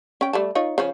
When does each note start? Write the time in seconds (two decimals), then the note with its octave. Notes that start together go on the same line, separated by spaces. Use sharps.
0.21 C#4 G5
0.33 G3 A3 A5
0.55 D#4 F4 C#5
0.78 C#3 F3 C#4